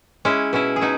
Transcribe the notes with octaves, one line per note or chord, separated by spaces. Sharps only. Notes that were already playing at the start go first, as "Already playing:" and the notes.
G#3 C#4 E4
B2 C#4 E4
G#4
B2 D#4 F#4